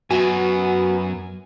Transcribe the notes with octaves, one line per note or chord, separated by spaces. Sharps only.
F#2 B3 F#4 G#5